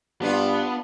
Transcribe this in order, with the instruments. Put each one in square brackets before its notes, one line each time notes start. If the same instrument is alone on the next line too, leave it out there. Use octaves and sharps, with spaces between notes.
[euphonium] G2 [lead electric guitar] B3 [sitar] D4 F4